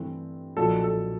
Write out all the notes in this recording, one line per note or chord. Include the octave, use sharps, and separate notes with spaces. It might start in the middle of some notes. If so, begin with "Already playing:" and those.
Already playing: G2 E3 A3 C4
B1 A#2 F3 A4
A4